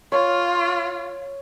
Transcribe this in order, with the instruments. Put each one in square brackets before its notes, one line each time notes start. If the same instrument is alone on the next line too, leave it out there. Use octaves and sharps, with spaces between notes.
[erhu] F4 [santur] C#5